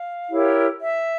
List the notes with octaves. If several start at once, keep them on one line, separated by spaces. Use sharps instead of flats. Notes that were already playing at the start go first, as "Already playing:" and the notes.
Already playing: F5
E4 G4 A#4 C#5
E5